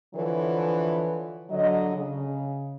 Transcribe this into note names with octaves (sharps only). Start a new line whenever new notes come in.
D3 E3 F3 A4 B4 C#5
D3 F#3 D#5
C#3